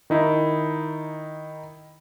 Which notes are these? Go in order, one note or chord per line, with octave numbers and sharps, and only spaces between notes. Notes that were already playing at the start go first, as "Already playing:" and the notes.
D#3 D#4 E4